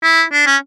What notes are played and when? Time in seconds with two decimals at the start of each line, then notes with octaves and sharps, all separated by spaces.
0.03 E4
0.32 D4
0.46 C#4